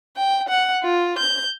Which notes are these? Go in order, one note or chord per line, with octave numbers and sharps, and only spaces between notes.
G5
F#5
F4
G6